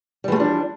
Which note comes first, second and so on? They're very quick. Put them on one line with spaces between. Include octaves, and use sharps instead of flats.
G3 E3 A3 F3 D4